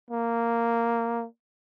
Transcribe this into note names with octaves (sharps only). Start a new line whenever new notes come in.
A#3